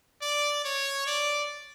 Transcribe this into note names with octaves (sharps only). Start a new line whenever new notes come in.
D5
C#5
D5